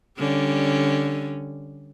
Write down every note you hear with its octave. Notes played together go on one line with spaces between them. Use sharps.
D3 G3 C#4